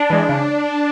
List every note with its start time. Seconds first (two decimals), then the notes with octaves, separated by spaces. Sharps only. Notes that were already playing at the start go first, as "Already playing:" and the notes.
Already playing: D4
0.10 E3 G#3
0.29 C#3